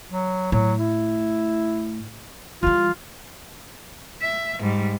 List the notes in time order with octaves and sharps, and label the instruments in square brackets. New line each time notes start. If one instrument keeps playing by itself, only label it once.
[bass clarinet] F#3
[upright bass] A2 [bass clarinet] F#3
[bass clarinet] E4
[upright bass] E3 G3 [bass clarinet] F4
[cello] E5
G#2 G3